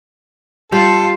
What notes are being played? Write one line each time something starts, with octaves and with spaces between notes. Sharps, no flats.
G3 F4 A4